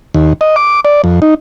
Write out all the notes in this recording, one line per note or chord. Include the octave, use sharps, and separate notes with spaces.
D#2
D#5
D6
D5
F2
D#4